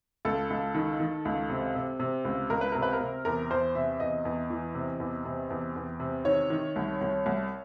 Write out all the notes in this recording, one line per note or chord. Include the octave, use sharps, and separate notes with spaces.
C#2 A4
C#2
D#3
D#3
C#2
C3
C3
C3
C#2
C#2 A#4
B4
C3 A#4
B4
A#4
C3
E2 A#4
E2 C5
C3 E5
E2 D#5
E2
E3
C3
E2
C3
E2
E2
C3
D#3 C#5
D#3
C2
C2
C2